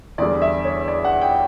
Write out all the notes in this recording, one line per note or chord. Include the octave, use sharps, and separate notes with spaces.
E2 D3 G3 D5
E5
C#5
D5
F#5
G5